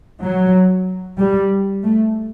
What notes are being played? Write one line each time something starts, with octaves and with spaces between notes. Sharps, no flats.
F#3
G3
A3